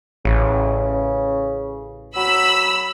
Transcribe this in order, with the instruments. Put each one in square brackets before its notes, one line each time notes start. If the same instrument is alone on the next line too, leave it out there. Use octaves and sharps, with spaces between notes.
[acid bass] A1 [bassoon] C#3
[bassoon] F#3 [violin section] B5 E6